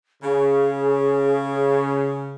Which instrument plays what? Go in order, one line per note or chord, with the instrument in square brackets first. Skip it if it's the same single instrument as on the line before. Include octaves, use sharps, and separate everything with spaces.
[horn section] C#3 [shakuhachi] G#4